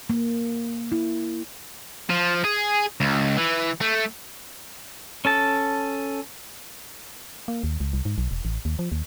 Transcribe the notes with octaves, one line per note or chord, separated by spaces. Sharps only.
A#3
E4
F3
G#4
C#2
E3
A3
C#4 A4 A5
A#3
D#2
C#2
C2
G#2
B1
E1
A1
D#2
F3
D#2